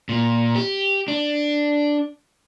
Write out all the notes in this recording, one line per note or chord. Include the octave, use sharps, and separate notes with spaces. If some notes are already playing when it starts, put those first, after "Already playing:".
A#2
G4
D4